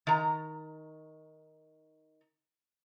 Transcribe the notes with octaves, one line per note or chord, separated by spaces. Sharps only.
D#3 A#5